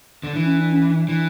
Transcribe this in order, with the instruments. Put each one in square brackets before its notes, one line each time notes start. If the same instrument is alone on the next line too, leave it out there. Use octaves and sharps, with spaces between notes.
[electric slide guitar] D3
[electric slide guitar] E3 [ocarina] D4
[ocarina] C#4
D4
C#4
D4
[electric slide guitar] E3